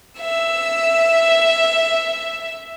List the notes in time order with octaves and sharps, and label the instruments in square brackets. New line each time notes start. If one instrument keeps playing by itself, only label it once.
[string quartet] E5 E6